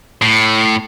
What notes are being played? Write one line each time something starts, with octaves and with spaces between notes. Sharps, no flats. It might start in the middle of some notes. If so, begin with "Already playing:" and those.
A2